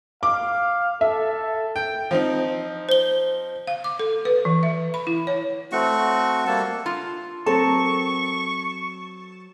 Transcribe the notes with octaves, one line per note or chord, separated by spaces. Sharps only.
F5 D6
A4 E5
G5
F3 C4 D#4
C5 G7
F5
D6
A4
B4
E3
E5
B5
E4
C#5
A3 C4 F#4 C#6
G3 A#3 A4 A5
F4
F#3 C4 A4 A#4 A5 C#6